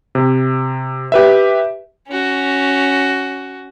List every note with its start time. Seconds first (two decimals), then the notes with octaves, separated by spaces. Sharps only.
0.15 C3
1.12 G4 B4 E5
2.08 C#4 F#4